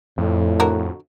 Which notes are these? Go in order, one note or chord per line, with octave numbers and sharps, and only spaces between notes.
F2 A2
D3 F#4 A#4